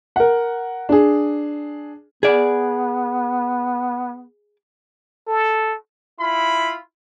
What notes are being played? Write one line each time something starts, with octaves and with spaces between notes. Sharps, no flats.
A#4 F#5
D4 G#4
B3 G#4 D5
A4
E4 F4 B5